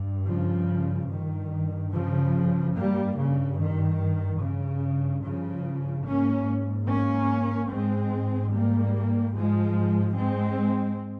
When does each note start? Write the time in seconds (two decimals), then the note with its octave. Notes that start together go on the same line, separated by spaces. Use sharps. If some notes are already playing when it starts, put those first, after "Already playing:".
Already playing: G2
0.25 C#3 F3
1.08 G2 D#3
1.91 C#3 F3
2.74 G2 G3 A#3
3.16 C#3
3.57 D#3
4.39 G2 C#3
5.23 C#3 F3
6.05 G#2 A#3 C#4
6.88 A#3 C#4
7.71 G#2 G#3 C4
8.54 G3 A#3
9.37 G#2 F3 G#3
10.19 G#3 C4